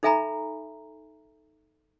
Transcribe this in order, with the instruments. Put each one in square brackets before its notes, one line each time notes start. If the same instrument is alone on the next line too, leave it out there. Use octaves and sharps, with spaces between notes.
[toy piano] D#4 A4 E5 G#5 A#5 B5